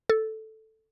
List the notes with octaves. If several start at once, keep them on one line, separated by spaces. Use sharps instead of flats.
A4